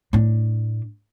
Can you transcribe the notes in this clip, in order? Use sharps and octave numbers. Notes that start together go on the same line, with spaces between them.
A2 D4